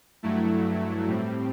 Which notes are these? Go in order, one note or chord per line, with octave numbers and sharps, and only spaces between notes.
G2 F#3 A3 E4
A2 G3 C4